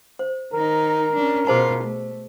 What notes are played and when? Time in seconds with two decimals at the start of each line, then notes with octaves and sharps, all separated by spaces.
0.19 C5
0.53 D#3 D#4 A#4
1.16 C#4 D4
1.47 B2 F4 G#4 C5 A5
1.83 A3